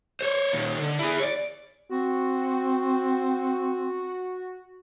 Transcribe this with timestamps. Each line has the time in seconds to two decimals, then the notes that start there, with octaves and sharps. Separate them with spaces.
0.21 C5 C#5
0.53 A#2 D#3
0.78 D3
0.99 E4 G#4
1.20 C#5 D5
1.90 C4 F#4